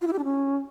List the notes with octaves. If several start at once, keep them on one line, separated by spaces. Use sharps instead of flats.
F4
E4
G4
D4
C#4